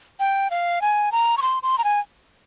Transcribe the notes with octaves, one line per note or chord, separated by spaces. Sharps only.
G5
F5
G#5
A#5
C#6
C6
C6
A#5
G#5